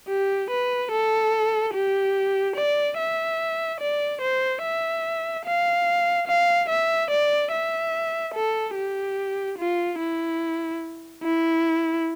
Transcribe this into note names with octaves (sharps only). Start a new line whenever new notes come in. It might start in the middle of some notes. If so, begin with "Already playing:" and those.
G4
B4
A4
G4
D5
E5
D5
C5
E5
F5
F5
E5
D5
E5
A4
G4
F4
E4
E4